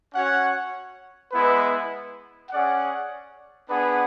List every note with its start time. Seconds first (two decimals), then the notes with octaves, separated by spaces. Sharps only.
0.13 C#4 F#4 C#5 F#5
1.32 G#3 B3 E4 B4
2.50 C#4 G#4 D5 F#5
3.68 B3 D4 G#4 B4 F#5